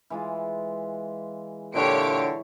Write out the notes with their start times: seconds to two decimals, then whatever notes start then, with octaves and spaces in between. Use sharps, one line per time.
0.10 E3 G#3 F4
1.74 A#2 D3 E4 G4 C#5 D7